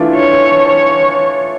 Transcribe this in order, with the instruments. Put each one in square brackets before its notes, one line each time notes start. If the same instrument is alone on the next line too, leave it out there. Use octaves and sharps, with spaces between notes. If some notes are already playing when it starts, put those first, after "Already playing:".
Already playing: [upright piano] E3 A3 D4 F4
[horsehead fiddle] C#5
C#5